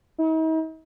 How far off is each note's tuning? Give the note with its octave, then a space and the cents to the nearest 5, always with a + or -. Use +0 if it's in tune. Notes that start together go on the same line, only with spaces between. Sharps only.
D#4 +45